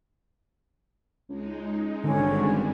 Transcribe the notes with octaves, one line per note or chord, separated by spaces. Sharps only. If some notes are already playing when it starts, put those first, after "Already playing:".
C#2 G#3 D#4
G#1 G2 D3 G3 G#3 C#4